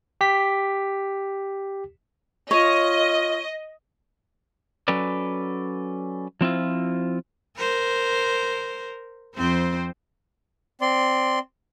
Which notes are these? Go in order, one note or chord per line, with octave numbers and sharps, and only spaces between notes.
G4 B6
F4 C#5 D#5
F#3 C#4 A4 B4 D5
F3 C4 E4 F4
A#4 C5
F2 C4 C5
C4 D5 C6